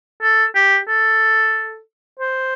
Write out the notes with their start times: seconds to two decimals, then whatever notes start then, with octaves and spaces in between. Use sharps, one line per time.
0.22 A4
0.55 G4
0.88 A4
2.19 C5